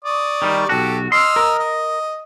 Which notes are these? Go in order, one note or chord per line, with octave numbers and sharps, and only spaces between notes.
D5 C#6 D#6
D#3 G3
B1 F#4 G4 A4
D#5 C6 E6 F6
A#4
D#5